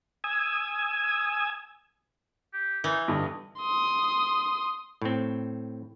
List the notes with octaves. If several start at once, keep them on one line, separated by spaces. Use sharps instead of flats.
G#5 D#6 E6 G#6
G4
E3 D#4
G2 D3 D#5
C6 D#6
A2 C4